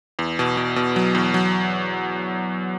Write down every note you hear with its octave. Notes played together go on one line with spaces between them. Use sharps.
E2
B2
B2
B2
F#3
E2
F#3